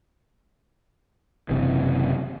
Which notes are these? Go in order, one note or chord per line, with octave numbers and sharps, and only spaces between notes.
F#1 C3 E3